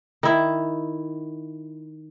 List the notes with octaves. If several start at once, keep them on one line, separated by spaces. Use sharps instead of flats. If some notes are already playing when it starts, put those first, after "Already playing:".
D#3 E4